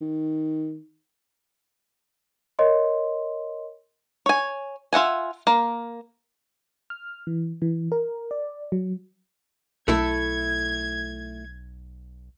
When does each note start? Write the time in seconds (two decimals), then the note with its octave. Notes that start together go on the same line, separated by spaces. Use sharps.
0.01 D#3
2.59 A#4 C#5 D#5 C6
4.26 C#5 G#5
4.93 F4 E5 F#5 G#5
5.47 A#3
6.90 F6
7.27 E3
7.62 E3
7.92 A#4
8.31 D5
8.72 F#3
9.88 B1 A3 E4 A4 G#6